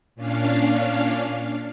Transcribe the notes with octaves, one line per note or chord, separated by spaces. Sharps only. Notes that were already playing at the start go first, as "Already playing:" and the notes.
A#2 C#4 D4 F5